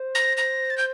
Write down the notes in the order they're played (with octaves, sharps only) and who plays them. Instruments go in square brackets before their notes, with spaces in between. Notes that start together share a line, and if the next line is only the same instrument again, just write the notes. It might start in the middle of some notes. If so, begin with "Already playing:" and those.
Already playing: [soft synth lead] C5
[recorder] A#6
A#6
A6
G6